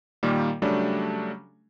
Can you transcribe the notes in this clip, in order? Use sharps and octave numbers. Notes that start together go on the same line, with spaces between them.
A#2 D#3 G3 A#3
C#3 F#3 G3 A3 D4